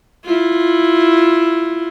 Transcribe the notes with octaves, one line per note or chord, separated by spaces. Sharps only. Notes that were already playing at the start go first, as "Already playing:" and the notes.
E4 F4